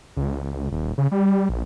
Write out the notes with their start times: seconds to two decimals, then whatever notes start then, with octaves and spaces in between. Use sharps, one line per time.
0.16 C#2
0.72 D#1
0.98 C#3
1.11 G3
1.49 A#1